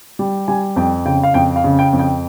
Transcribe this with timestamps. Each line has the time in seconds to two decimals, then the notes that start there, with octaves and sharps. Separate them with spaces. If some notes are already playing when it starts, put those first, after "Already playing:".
0.19 G3
0.48 G3 G#5
0.76 F2 G5
1.05 C#3 G5
1.23 F5
1.34 F2 G5
1.56 F5
1.64 C#3
1.79 G5
1.93 F2
1.99 G5